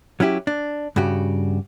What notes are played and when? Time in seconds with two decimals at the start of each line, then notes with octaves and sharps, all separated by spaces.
0.20 F#3 C#4 E4 G4
0.47 D4
0.96 G2 C#3 F#4 G4